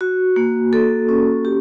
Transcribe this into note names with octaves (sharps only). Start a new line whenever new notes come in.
F#4
A#3
A4
C#4
G4